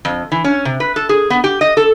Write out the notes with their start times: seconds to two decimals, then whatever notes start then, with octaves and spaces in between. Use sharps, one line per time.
0.05 F2
0.32 E3
0.44 C#4
0.65 C3
0.80 B4
0.96 A4
1.09 G#4
1.30 B3
1.44 G4
1.61 D#5
1.77 A4